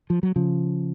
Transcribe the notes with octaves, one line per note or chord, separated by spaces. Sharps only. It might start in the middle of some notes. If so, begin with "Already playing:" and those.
F3
F#3
C#3 F3